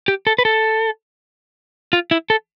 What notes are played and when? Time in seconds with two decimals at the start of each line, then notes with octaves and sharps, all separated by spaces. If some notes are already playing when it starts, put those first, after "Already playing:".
0.08 G4
0.27 A4
0.38 B4
0.45 A4
1.93 F4
2.11 E4
2.30 A4